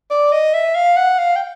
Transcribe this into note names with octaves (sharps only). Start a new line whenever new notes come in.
D5
D#5
E5
F5
F#5
F5
G5